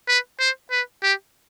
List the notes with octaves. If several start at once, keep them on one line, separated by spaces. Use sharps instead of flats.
B4
C5
B4
G4